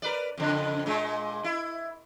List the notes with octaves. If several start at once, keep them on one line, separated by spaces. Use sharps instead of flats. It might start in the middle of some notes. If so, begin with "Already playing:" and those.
A#4 B4 D5
F2 C#3
A#2 G#3
E4